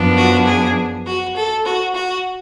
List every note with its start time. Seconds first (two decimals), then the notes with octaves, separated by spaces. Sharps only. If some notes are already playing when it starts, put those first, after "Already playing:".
Already playing: F#2 F3 B3 D4
0.17 F#4
0.46 G#4
1.06 F#4
1.36 A4
1.66 F#4
1.95 F#4